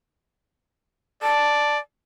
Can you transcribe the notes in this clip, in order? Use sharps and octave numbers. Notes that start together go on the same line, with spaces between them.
D5 A5